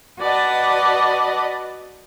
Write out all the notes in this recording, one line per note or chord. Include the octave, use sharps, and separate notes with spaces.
F#4 B4 D5 D#5 A5